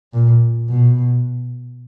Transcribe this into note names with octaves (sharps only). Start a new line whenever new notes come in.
A#2
B2